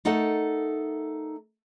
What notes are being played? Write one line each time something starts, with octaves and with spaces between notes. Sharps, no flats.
A3 D#4 A4 A#4 D#5 F#5